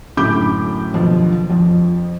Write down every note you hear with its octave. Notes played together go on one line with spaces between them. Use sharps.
F#2 A2 D3 B5 D6 G6
D#2 B2 D3 F3 F#3
F2 F3